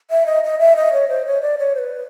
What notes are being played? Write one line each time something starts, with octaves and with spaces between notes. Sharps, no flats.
E5
D#5
D#5
E5
D#5
C#5
C5
C#5
D5
C#5
C5
B4